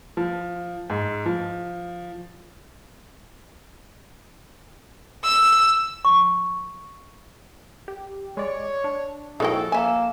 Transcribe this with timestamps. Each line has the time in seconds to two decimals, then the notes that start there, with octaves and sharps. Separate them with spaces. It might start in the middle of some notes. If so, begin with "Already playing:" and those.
0.17 F3
0.90 G#2
1.26 F3
5.24 E6
6.05 C#6
7.88 G4
8.37 G#3 C#5 D5
8.84 D4
9.40 A#2 F3 G#3 D#4 E4 F#4 A4 G5
9.72 A#3 E5 G#5 E7